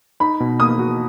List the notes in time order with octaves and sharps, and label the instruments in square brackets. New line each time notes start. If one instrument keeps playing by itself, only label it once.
[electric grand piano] D#4 [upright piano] B5
[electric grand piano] B2
[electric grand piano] A#3 [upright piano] D#6
[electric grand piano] F#4